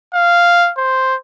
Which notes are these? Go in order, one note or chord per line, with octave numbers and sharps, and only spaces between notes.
F5
C5